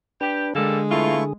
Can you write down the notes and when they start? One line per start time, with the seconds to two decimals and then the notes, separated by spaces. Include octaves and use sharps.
0.21 D4 G4 B4
0.55 D3 G3 G#3 A#3 G#4 A4
0.90 E2 A3 E4 F4 C#6